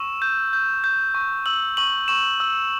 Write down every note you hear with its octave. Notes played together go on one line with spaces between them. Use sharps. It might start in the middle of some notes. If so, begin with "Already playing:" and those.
Already playing: C#6 E6 E7
G6
G6
G6
C#6
E6 F#7
C#6 F#7
C#6 E7
E6